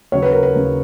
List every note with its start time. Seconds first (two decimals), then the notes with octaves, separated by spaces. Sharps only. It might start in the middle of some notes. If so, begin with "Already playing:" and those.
0.12 D#2 C#3 F#3 C#5
0.22 B4
0.32 A#4
0.43 B4
0.55 D#2 C#3 F#3